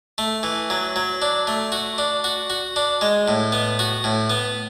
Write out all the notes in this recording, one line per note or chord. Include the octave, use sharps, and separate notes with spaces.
A3
E3
F#3
F#3
D4
A3
F#4
D4
F#4
F#4
D4
G#3
A2
B3
F#4
A2
B3